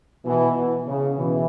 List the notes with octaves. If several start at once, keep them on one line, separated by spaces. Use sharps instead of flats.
B2 E3
C#3
B2 E3